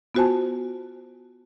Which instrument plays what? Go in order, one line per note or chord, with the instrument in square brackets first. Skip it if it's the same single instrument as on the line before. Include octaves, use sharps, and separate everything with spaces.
[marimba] B3 F4 F#4 C5 G#5 A5